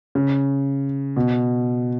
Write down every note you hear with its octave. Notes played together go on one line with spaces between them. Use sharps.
C#3
B2